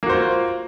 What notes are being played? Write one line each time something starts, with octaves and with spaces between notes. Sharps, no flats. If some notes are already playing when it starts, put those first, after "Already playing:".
A#3 F4 F#4 C5